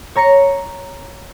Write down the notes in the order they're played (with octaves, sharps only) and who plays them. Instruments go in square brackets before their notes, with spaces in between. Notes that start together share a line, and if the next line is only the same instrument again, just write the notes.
[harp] C#5 A#5 A#6 C#7